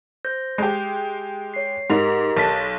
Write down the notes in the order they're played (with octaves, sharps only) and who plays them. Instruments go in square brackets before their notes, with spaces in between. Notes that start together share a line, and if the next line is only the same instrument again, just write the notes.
[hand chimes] C5 G6 A#6
[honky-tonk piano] G#3 G4 [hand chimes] G6
[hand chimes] C#5 C7
[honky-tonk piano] G#2 F7 [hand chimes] G4 A#4 D#5
[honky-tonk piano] B1 A5 B6